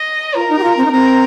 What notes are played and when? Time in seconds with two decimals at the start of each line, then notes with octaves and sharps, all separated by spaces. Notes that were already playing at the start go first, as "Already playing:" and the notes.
Already playing: D#5
0.35 F4 A#4
0.49 D#4
0.59 G4
0.63 F4
0.77 C4
0.85 D#4
0.92 C4 A#4